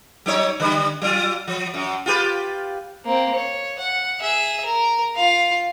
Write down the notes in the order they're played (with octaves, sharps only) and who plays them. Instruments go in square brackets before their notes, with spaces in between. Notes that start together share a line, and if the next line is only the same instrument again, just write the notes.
[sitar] F#3 D#4 C#5
D3 G3 B4
F#3 F4
F3
F#2
F4 G4 B4
[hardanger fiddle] A#3 C4
C#5
F#5
G#4 E5
A#4
F4 F5